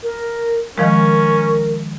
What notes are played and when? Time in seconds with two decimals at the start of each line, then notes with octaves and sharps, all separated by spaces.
0.03 A#4
0.78 D#3 F3 G#3 C#4 A#4